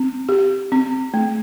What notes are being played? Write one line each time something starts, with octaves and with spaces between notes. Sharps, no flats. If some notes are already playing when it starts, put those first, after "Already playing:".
Already playing: C4
G4
C4
A3